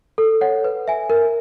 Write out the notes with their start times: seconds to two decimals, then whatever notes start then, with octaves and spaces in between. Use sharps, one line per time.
0.18 A4
0.41 C#5 F#5
0.64 B4
0.88 E5 G#5
1.10 A#4